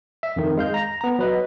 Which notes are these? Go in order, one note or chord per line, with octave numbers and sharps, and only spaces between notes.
E5
F2 D#3
G#3 F5 G6
A#5 A#6
B3 A#5
F#3 B4 D#5